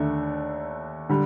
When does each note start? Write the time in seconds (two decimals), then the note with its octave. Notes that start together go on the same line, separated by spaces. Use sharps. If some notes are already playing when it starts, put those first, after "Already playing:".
Already playing: D#2 D3 A3 D4
1.09 D3 G3